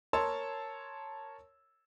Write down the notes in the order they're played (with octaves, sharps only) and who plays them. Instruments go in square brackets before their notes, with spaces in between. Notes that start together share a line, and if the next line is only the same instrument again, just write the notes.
[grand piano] A#4 C#5 A5 C6 E6